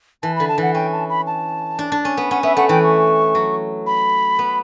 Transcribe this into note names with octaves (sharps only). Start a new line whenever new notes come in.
E3 A5
D3 B5
A5
E3 F#5
C#4 G5
A5
B5
A5
D4
D4
C#4
B3
C#4 F#5
B3 E5
A3 F#5
E3 G5
C#6
F#3
B5
B3